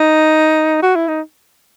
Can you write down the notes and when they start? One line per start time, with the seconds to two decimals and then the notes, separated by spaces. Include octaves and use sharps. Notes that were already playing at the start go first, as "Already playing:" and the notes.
Already playing: D#4
0.83 F#4
0.96 E4
1.08 D#4